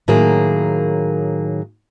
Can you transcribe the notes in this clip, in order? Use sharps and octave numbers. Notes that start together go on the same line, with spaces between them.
A2 D#3 F#3 A#3 G#4